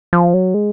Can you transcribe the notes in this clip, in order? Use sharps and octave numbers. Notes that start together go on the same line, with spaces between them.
F3
F#3
G#3